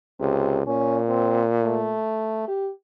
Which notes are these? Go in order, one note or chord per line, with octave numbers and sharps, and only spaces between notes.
C#2 C3
A#2 C#4
C4
A3
G4